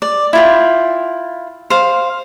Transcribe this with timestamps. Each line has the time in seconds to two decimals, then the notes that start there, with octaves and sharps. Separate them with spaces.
0.02 D5
0.33 E4 F4 G5
1.70 C5 F5